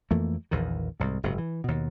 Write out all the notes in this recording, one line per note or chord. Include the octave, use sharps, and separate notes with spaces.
F2 E3 A3 A#3
A#1 E2 D#3
C2 G#2
F#1 G#2 C3
E3
D#2 B2